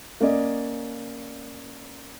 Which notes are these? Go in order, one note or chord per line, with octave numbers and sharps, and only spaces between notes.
A#3 C#4 D5 D#5